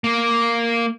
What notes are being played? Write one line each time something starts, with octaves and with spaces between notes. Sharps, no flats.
A#3